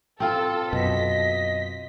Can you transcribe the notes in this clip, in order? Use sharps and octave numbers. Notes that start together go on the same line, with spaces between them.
C4 F4 A4
F#2 B2 D#5 B6